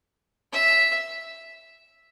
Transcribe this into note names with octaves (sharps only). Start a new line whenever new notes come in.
E5